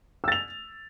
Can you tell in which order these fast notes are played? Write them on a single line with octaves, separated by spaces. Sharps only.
E6 A6 F7